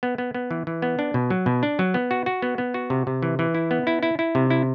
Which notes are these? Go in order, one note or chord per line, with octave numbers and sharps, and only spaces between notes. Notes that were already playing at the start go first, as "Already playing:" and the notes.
B3
B3
B3
E3
E3
B3
D4
B2
F#3
B2
D4
F#3
B3
F#4
F#4
B3
B3
F#4
C3
C3
E3
E3
E4
B3
E4
E4
E4
C3
E4